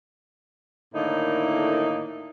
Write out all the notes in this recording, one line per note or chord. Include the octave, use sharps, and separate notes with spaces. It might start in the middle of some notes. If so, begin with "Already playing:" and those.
A2 D3 D#3 A#3 D#4 E4